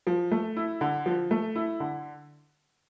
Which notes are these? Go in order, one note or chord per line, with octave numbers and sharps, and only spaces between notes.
F3
A3
E4
D3
F3
A3
E4
D3